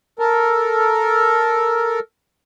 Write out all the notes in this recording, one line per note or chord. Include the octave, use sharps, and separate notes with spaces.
A4 A#4